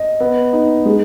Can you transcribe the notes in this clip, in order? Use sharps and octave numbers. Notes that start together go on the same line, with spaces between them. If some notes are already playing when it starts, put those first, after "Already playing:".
Already playing: D#5
B3
D#4
G#3